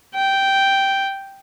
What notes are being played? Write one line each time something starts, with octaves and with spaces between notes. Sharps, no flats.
G5